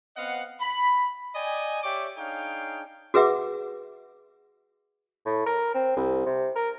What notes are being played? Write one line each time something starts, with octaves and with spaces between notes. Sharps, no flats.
B3 C4 D#5 F5 F#5
B5
D5 D#5 G5 G#5
G4 C#5 D5 E5 G5 D6
D4 D#4 G#4 C#5 F5 G5
F#4 G#4 B4 E5 F#5 D6
A2
A#4
C4
C2
C3
A#4